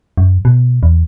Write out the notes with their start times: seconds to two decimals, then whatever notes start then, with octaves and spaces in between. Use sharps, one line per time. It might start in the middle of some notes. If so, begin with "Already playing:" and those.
0.17 F#2
0.45 B2
0.83 E2